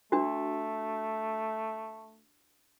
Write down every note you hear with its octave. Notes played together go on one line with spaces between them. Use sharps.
A3 D4 F#4